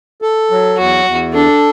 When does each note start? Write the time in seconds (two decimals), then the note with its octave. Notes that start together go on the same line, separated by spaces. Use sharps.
0.22 A4
0.51 F#3
0.78 E2 F#4
1.05 E2
1.34 D4 A4